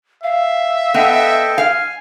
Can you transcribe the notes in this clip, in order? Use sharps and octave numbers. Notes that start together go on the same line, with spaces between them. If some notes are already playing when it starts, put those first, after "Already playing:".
E5 F5
B3 A4 D#5 G5
F5 G#5